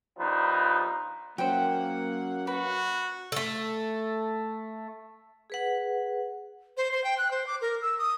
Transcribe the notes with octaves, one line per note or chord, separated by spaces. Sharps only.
A#1 F3 G3 D#4 B4
F#3 A#3 C#4 C5 F#5 G5
F#4 B4
A3 A4
G#4 B4 F#5
C5
C5
G5
F#6
C5
D6
A#4
E6
D#6